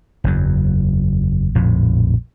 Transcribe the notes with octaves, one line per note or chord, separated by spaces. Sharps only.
F#1 E2 F#3
A#1 F2 A2